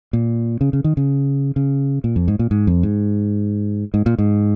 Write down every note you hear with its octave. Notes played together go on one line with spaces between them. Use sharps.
A#2
C#3
C#3
D#3
C#3
C#3
A#2
F2
G#2
A#2
G#2
F2
G#2
G#2
A#2
G#2